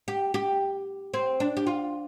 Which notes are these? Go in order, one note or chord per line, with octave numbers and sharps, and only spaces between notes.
G4
G4
C4
D4
G4
F4